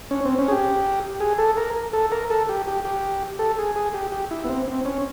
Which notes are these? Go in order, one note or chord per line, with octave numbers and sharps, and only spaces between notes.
C#4
C4
C#4
G#4
G4
G#4
A4
A#4
A4
A#4
A4
G4
G4
G4
A4
G#4
G#4
G4
G4
E4
B3
C4
C4
C#4